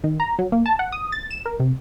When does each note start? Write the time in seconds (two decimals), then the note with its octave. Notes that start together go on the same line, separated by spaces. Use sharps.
0.04 D#3
0.20 A#5
0.39 F#3
0.52 A#3
0.66 A5
0.79 F#5
0.92 D#6
1.12 A6
1.31 E7
1.46 A#4
1.60 C3